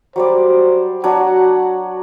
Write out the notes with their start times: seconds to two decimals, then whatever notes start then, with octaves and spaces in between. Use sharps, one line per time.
0.16 F#3 G3 C5 D5
1.04 F#3 D4 F#4 F#5